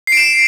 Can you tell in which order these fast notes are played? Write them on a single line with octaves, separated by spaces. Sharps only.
C7 D7 E7